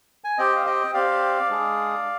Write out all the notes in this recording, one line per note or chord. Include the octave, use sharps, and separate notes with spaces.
G#5
C4 G4 D#5 G5
F5
D#5 G5
C4 G4 D5 F5
G#3 D4 G#4